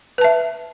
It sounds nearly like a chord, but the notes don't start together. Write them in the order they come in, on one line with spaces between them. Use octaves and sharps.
B4 A5 E5